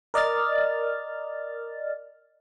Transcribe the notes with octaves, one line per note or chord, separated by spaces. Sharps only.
A#4 D5 D#5 F6 A6